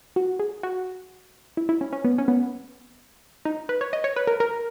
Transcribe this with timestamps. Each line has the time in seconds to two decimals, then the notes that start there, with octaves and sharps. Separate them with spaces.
0.16 F#4
0.39 G#4
0.63 F#4
1.57 E4
1.69 E4
1.81 C#4
1.93 C#4
2.04 B3
2.18 C#4
2.28 B3
3.45 D#4
3.69 B4
3.81 C#5
3.93 D#5
4.04 C#5
4.16 B4
4.27 A#4
4.40 A#4